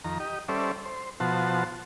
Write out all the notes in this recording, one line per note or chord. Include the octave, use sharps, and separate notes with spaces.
F2 D#3 A#5
G4 D#5
G3 C#4 A4 C5 D5 E5
C5
B2 F3 F#4 C5 A5